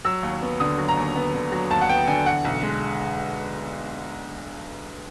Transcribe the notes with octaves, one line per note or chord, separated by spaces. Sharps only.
F#3 E6
D#2
B3
D3 D#6
F#3
A#5
D#2
B3
D3
F#3
D#2 A5
F#5
B3 G5
D3 G#5
E3 F#5
B1
G#3